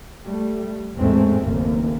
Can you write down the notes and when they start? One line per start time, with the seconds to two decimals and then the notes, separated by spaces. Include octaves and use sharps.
0.24 G3 A3
0.96 A1 E2 G#2 G#3 A3 C4
1.41 F#1 D#2 A3 A#3